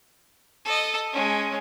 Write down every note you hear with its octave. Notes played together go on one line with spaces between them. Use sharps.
A4 D#5
G#3 C#4